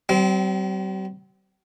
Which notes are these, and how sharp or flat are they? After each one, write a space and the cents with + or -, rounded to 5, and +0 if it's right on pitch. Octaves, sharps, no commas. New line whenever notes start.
G3 -45 C4 -20